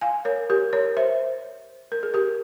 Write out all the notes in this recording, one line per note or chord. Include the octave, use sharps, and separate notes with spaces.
F5 G#5
A#4 C#5
G4 A#4
A#4 C#5
C5 E5
A#4
G#4
G4 A#4